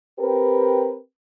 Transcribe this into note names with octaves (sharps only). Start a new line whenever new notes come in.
C4 G4 A#4 B4